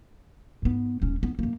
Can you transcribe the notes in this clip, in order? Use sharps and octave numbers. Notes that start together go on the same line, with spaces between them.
G#2 B3
D#1 C#4
B3
F#2 A#3